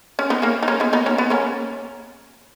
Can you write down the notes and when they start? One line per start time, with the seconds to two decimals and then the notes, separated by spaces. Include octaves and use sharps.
0.19 C#4
0.30 B3 D#4
0.42 A#3 C#4
0.63 D#4
0.68 A#3 C#4
0.80 B3 D#4
0.93 B3 D#4
1.06 A#3 C#4
1.18 B3
1.30 A#3 C#4